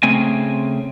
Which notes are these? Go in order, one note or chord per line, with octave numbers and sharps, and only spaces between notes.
C#3 A3 C4 G#5